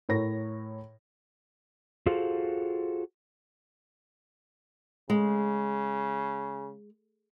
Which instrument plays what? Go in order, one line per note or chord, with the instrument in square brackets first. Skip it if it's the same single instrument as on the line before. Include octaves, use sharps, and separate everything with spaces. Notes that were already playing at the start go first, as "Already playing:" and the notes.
[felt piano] A2 A#4 C#5 A#6
[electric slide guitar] F4 F#4 G#4 A4 C5 F5
[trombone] C#3 [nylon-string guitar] G#3